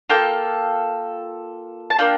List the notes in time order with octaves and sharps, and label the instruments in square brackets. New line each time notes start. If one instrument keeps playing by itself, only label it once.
[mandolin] A#3 F4 A4 G5
A5
A#3 D4 F4 G5